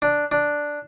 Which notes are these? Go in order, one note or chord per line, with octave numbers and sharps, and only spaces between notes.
D4
D4